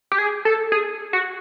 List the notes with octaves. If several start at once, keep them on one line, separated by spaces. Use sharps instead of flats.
G4
G#4
A4
G#4
F#4